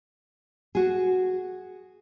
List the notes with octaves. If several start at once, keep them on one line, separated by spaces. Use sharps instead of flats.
F#4 G#4